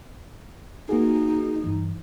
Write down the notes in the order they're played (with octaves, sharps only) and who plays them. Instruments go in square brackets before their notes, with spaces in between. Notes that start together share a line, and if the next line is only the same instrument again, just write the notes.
[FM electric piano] A#3 F#4 G#4 [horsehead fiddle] D#4
[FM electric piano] G2 E3